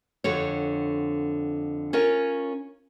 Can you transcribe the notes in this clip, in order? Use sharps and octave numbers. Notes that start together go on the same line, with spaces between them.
F2 D3 F#4 C#5
C#4 F4 A#4 C#5